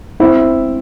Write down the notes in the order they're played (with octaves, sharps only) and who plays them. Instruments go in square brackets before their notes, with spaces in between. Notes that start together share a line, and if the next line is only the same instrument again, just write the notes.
[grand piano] C4 E4